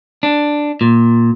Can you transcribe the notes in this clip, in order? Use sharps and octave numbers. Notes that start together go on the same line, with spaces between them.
D4
A#2